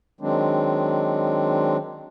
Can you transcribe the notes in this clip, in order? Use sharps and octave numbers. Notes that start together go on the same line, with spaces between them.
D#3 F#3 G#3 C4 D4